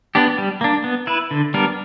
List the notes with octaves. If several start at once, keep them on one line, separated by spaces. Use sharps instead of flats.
B3 D4 G4
G3
A#3 D4
B3
E4 B4
D3
G3 B3 D4 A#4